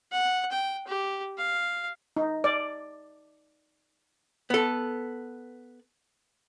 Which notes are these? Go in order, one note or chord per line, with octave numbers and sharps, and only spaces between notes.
F#5
G5
G4
F5
D#4
D5
B3 A4